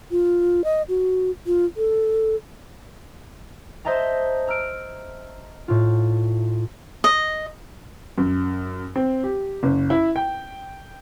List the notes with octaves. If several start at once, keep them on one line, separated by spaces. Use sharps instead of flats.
F4
D#5
F#4
F4
A4
C5 D#5 E5 A5 A#5
A#5 E6 F6 D7
A2 F4
D#5
F#2
C4
G4
F#1
E4
G5